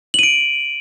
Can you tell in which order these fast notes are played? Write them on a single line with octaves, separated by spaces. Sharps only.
F#7 D#7 D7